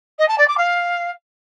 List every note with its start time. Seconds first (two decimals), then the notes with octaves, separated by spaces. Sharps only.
0.18 D#5
0.28 A5
0.37 D5
0.47 D6
0.57 F5